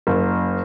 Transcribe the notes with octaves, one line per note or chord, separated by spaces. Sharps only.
F#1